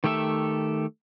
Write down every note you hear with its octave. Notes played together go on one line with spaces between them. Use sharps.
D#3 A3 G4 A4 E5